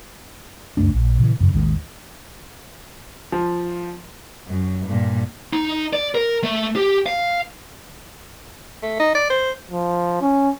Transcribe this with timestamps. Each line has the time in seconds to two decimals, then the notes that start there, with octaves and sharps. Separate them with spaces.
0.77 C#2 F#2 A3 D4
0.93 A#1
1.18 A#2 C#3 E3
1.40 F#2 C#3
1.52 A1 D#2 D#3 G#3
3.32 F3
4.47 F#2
4.87 G2 A#2
5.53 D#4
5.93 D5
6.15 A#4
6.44 A3
6.76 G4
7.06 F5
8.83 A3
8.99 D#4
9.15 D5
9.30 C5
9.71 F3
10.22 C#4